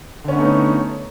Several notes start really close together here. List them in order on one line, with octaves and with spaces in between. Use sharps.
D3 C#4 B3 A3 D#4